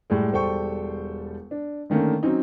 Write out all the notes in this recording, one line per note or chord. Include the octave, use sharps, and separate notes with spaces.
A2 G3 G#3
E1 G3 A4 C5 G5 C#6
D4
D3 D#3 A3 A#3 C#4
F#3 C4 C#4 D#4